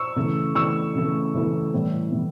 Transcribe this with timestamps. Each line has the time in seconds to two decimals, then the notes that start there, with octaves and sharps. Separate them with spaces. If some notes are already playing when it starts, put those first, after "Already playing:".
Already playing: C#6 E6
0.16 C#3 E3 A3
0.55 C#3 E3 A3 C#6 E6
0.95 C#3 E3 A3
1.34 C#3 E3 A3
1.74 A2 E3 G3
2.12 A2 E3